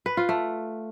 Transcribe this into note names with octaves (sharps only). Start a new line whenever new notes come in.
B4
F4
A3